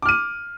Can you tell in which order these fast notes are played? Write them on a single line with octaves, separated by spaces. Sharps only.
D6 F6 D#7